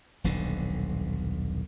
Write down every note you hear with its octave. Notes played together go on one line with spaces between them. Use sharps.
D#1 B1 B2 D3